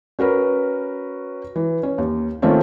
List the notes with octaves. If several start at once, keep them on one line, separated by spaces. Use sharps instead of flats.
C#4 F#4 A#4 B4
E3
C#4
D#2
D#3 A3 A#3 C4 C#4 F4